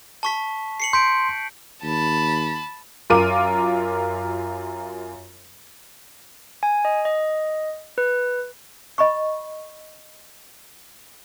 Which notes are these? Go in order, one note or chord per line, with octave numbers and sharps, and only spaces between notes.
A5 C#6 B6
C7 C#7 F#7
C6 G6 B6 D7
D#2 A5 B5
F#2 F4 A#4 D6 D#7
G#5
D#5
D#5
B4
D#5 B5 C#6